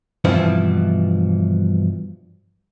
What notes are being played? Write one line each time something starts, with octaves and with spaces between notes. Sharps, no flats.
G2 B2 E3 F3 C4 E4